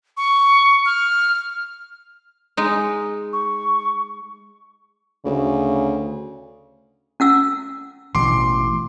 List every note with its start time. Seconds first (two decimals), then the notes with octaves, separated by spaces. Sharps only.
0.17 C#6
0.86 F6
2.57 G#3 D#4
3.33 C#6
5.25 D2 C#3
7.20 C#4 F#5 E6
8.15 A1 B2 E3 C6 D6